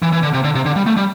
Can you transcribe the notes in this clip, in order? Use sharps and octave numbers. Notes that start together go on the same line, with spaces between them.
E3
E3
D3
C3
D3
C3
D3
G3
A3
G3